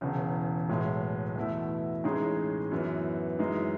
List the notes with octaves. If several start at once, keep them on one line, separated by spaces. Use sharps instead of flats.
E1 E2 C#3
B1 A2 E3 G#3
E2 B2 A3 E4
A1 A2 G#3 D#4 G#4
F#2 E3 B3
F#2 E3 G#3 D#4